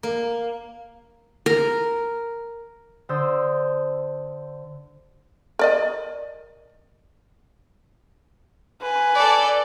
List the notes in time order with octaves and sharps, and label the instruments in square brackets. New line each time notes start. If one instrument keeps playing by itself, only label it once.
[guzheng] A#3
[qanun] A#4
[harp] D3 C5 D#6 E6 G6
[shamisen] A#4 D5 D#5
[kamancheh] B4 G#5
[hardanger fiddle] A4 D5